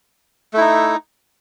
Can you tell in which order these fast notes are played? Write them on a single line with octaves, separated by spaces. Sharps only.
A3 E4 D#4